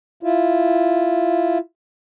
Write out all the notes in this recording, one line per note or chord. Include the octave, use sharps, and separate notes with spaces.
E4 F4